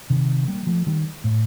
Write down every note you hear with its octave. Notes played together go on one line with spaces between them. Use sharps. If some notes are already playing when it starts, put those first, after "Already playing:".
C3 D#3
G3 A#3
F3 A3
D#3 G3
A2